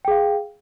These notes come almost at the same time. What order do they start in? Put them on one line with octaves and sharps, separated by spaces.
G5 G#4 F5